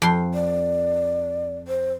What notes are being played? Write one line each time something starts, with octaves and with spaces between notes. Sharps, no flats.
F2 C6
D5
C5